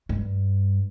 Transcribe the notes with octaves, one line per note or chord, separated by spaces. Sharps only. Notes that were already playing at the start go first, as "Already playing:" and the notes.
G2